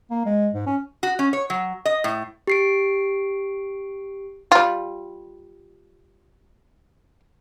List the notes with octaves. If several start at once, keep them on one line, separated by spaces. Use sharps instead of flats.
A#3
G#3
G#2
C#4
F#4
C#4
C#5
F#3
D#5
A2
G4 C7 D7
G3 F4